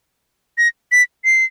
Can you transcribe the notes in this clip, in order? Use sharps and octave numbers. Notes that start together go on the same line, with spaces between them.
A#6
B6
C7